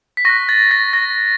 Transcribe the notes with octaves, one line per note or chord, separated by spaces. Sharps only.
B6
C#6 F#6 A#6
A6
A#6
A#6